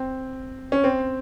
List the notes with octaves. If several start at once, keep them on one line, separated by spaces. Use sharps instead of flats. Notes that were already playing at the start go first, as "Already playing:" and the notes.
Already playing: C4
C#4
C4